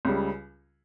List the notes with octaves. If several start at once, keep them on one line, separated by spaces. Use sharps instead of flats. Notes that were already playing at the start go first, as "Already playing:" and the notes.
C#2 C#3 G3